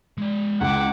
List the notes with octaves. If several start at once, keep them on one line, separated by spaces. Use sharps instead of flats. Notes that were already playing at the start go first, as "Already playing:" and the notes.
G#3 D5
C#2 E4 E5 F#5 D6